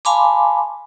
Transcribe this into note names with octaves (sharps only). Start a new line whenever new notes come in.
F5 G#5 A5 B5 C6 D6